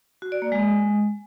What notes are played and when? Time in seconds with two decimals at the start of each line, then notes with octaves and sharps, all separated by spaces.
0.22 F#4
0.32 D5
0.42 A#3
0.52 G#3